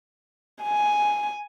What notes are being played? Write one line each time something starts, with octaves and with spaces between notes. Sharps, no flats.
G#5